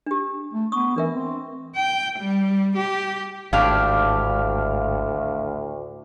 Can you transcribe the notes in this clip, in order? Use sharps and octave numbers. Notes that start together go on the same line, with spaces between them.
D4 G4
A3
B3 C#6 D#6
E3 D4 A#4 E5
C4
G5
G3
G4
G#1 D2 A2 D4 G4 F5 F6